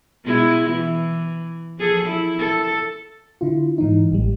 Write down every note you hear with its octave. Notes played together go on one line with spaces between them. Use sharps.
B2 G#3 E4
E3
F3 G#4 A4
E4
A4
D3 E4 F4
G#2 E3 D#4
A1 G3